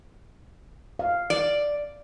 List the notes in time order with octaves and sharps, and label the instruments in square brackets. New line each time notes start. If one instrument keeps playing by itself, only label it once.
[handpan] F5
[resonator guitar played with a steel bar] D5